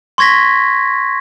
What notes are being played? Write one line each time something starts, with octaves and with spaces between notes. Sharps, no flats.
C6 C#6 G#6 A#6 B6